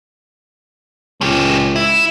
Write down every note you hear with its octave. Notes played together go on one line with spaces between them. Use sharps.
C#2 C#4 G4
E4